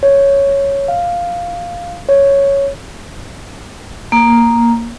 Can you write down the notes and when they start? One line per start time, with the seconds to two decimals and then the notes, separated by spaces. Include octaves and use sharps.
0.03 C#5
0.88 F5
2.09 C#5
4.12 A#3